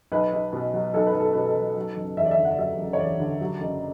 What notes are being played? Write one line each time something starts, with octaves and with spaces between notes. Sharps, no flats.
B1 B4
B1
B2
F#3
B1 A4
B4
B1
A4
B2 B4
A4
F#3
F#3
F#1
E2 E5
D5
E5
D3
F#5
D5
F#3 E5
F#1
C#5
E2 D5
D3
F#3
F#1